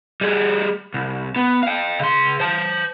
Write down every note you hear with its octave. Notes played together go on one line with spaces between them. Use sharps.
G3 G#4
C2
B3
F5 G5
C#3 C6
C5 A5